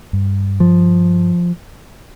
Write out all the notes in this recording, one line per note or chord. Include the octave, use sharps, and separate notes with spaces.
G2
F3